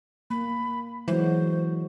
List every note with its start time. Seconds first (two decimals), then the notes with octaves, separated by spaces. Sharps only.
0.30 A#3 B5
1.08 E3 F#3 G#3 F#4 C5